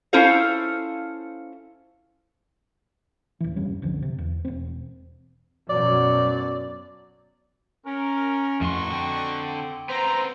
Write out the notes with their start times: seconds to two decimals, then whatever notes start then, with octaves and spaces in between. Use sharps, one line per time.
0.13 C#4 E4 F4 A4 C5 F5
3.40 D1 E3
3.56 F1 G2 G3 C#4
3.82 F#1 C2 D3 F3
4.02 C3
4.18 E2
4.45 E1 C4
5.70 F#2 B2 F#3 D5
7.86 C#4 A#4
8.61 F2 A2 D#4 F#4 C6 C#6
8.92 D3 C4
9.89 B3 C4 C5 A#5